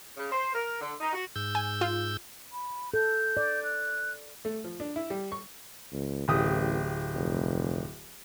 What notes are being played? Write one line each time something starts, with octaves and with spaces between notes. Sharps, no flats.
C#3
C5
A#4
D3
D#4
F#4
G#2 E6 G6
G#5
F4
B5
A4 G6
D5
F#6
A3
F3
D4
E4
G3
C#6
C#2
D1 A1 G4 D#6
F1